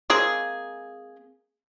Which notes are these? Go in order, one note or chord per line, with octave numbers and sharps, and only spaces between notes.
G#3 A#3 C4 G#4